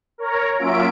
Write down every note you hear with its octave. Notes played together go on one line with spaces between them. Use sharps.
A#4 C#5 A#5
F#3 A#3 C#4 F4 E5 D7